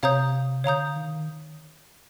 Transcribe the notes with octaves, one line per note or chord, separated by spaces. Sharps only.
C3 C#5 F5 A#5 D#6 G6
D3 C#5 F5 A#5 D#6 G6
D#3